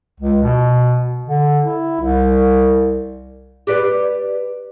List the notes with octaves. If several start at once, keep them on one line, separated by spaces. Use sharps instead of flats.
C#2
B2
D3
E4
C2
G4 B4 D5